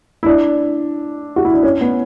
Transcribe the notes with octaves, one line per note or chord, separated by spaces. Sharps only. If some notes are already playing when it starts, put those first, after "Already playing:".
E4
D4
F#4
E4
D4
C#4
B3